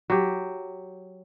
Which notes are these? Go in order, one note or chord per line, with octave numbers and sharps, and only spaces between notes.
F#3 G4